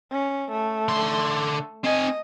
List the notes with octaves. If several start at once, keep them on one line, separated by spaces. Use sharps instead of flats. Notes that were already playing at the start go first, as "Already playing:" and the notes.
C#4
A3
D3 C6
C4 D#5 G#5